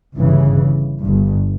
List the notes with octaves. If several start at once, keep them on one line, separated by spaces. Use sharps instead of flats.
G1 G2 C#3 E3
G1 G2